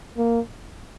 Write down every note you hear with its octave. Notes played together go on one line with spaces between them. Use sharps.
A#3